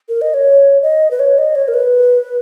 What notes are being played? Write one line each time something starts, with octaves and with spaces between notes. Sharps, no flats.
A#4
D#5
C#5
D#5
B4
C#5
D#5
C#5
A#4
B4